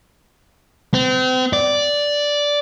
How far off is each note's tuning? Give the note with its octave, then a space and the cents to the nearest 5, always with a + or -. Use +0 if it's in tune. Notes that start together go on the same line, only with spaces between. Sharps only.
C4 -35
D5 -5